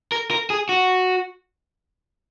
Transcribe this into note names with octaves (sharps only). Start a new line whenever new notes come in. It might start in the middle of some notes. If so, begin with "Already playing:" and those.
A#4
A#4
G#4
F#4